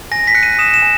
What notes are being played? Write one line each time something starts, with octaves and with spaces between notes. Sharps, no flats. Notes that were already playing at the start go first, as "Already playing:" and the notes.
G#5 A#6
B6
F#6 C#7
D#7
D#6 E7
E7
G#5